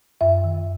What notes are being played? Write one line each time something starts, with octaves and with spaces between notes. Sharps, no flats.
F#2 E5
D#3